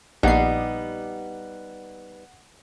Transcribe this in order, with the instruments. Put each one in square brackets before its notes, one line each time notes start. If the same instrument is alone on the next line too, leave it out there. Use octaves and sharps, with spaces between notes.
[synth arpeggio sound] A#1 C7 [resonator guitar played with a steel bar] G3 B3 D#4 [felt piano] F#5